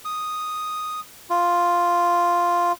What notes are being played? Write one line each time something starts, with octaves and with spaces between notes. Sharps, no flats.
D#6
F4